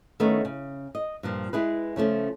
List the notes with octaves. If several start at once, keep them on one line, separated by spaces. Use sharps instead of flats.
D#3 A3 B3 C#4 D#4
C#3
D#5
G2 A#2 F3
G#3 E4 G#4 B4
C#3 F3 A3 C#4